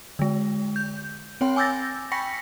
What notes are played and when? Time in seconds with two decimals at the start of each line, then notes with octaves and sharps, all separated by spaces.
0.19 D3 G#3
0.76 G6
1.41 C4 C#5 G5 C6
1.56 G#5 D6 E6 G6 A6 A#6
2.12 G5 B5 C#6 A#6 B6 C#7